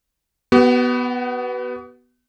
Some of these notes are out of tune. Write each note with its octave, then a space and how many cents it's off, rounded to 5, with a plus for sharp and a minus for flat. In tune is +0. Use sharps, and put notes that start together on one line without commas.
B3 +0 F#4 +45